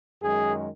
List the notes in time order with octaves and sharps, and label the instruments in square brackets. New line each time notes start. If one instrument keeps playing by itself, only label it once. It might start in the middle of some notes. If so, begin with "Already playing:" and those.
[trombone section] F#2 D#3 G#3 G#4